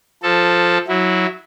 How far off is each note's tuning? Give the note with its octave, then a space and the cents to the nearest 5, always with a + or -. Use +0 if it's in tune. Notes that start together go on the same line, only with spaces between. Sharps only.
F3 +0 A4 +0
F#3 -10 E4 -15